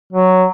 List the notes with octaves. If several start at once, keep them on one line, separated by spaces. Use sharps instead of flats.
F#3